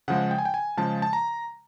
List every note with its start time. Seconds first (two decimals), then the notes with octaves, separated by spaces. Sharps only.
0.08 C#3 F3 G#3 F#5
0.31 G5
0.38 G#5
0.45 G5
0.54 G#5
0.77 C#3 F3 G#3 A5
1.02 A5
1.13 A#5